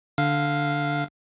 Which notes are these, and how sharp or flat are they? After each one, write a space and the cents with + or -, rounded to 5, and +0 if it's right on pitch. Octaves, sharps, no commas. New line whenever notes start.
D3 +0 F5 +0